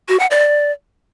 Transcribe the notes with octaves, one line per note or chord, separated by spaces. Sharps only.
F#4
F#5
D5